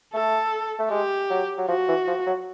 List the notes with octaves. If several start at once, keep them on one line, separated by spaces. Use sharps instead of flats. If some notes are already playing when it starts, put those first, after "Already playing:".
A3 A4
A3
G#3 G4
F#3
F#3
F3 F#4
E3
F3
F#3